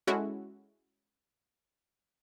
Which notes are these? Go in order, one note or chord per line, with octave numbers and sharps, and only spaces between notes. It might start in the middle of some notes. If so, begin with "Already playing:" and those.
G#3 C#4 E4 F#4 A4